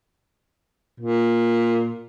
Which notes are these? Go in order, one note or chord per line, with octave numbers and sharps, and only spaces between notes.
A#2